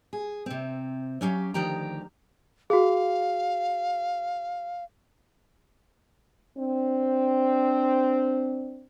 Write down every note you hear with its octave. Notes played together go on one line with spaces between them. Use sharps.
G#4
C3 C4
F#3 C#4 G4 F5
D2 D#3 F3 G4 G5 A#5
F#4 G#4 F5
C4 D4